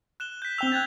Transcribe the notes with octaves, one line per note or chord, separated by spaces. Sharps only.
F#6 E7 G7
G6 B6
C4 G5 E6 F7 G7
F#6 G#6 A6